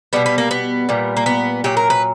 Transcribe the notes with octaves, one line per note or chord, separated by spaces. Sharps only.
B2 G3 B3
B3
A#3
B3
A#2 G3
A#3
B3
A#2 F#3 G4
A#4
B4